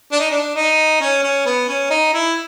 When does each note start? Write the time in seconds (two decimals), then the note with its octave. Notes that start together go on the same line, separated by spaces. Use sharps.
0.12 D4
0.20 D#4
0.30 D4
0.56 D#4
1.01 C#4
1.23 C#4
1.46 B3
1.69 C#4
1.91 D#4
2.14 E4